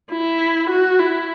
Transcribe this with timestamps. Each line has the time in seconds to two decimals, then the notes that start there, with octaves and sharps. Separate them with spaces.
0.11 E4
0.70 F#4
0.99 E4